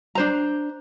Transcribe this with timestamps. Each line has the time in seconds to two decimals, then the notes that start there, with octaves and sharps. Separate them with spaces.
0.15 D4 C5 A#5